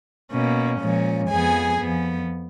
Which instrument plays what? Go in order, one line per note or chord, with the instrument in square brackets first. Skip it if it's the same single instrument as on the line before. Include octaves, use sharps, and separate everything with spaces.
[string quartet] B2 A#3 C#4
A#2 F3 G#3 C#4
F2 F3 B3 G#4 G#5
F2 F3 B3